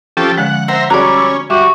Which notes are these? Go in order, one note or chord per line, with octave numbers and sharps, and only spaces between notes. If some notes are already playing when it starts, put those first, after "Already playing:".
F3 C#4 G4 A4
D3 F3 G#3 F#5
C5 E5 F#5 A#5
G3 C#4 F#4 G#4 D5 A#5
E6
G3 F#4 E5 D6